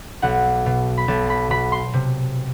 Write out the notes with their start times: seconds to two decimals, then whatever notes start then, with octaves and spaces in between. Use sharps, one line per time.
0.22 B1 F#5
0.66 B2
0.97 B5
1.08 B1 A5
1.30 B5
1.50 B2 B5
1.72 C6
1.93 C3